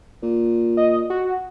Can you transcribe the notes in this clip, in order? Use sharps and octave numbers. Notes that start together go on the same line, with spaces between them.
A#2
D#5
F#4